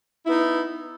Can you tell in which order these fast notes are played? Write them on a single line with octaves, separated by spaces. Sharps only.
E4 B3 D#4